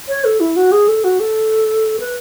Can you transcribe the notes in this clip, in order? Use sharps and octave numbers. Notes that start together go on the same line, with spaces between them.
C#5
A4
E4
F#4
G#4
A4
F#4
A4
B4